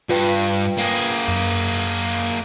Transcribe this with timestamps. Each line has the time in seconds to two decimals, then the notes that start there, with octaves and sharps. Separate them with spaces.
0.09 G2 F4 B4 G5
0.78 A#3 G#4
1.28 F#2